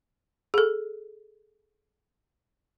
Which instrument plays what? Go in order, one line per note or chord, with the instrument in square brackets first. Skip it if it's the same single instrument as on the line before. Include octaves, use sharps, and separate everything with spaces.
[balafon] G#4 A4